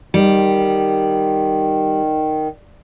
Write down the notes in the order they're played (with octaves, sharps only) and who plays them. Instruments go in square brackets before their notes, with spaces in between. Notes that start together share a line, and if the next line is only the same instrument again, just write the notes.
[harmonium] D#3 [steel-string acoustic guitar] G3